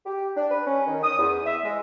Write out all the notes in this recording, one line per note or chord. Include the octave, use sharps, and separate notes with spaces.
G4
D4
B4
C#4
D#3
D#6
E2
E5
G#3